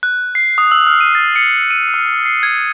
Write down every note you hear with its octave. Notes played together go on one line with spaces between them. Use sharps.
F#6
C7
D#6
E6
F6
D#7
A6
C#7
D#7
F6
C7
G#6